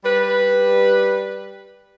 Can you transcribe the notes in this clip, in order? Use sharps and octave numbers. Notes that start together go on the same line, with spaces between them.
G3 B4